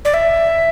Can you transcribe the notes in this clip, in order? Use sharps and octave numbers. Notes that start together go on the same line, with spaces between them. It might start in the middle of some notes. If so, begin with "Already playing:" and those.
D5
E5